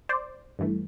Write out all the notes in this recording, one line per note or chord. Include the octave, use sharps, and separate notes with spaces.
C5 D5
G2 E3 A3